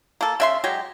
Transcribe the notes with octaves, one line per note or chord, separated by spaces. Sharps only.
A#3 A4
C#3 E5 C6
F#3 G#3 G4